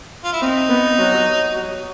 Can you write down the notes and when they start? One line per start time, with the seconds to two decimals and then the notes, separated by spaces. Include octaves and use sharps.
0.24 F4
0.33 E4
0.42 C4 D#4
0.69 B3
0.99 F#3
1.54 F#3